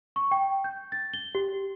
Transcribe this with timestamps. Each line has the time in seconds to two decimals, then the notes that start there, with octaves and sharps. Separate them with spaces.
0.16 C#6
0.31 G5
0.64 G6
0.92 A6
1.14 G7
1.35 G4